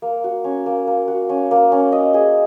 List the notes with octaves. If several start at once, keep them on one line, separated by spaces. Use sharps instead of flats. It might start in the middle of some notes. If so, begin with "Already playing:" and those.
A#3
F#4
C#4
A#3
A#3
F#4
C#4
A#3
C#4
D#5
G#4